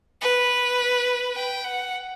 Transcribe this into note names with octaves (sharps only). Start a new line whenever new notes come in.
B4
G5
F#5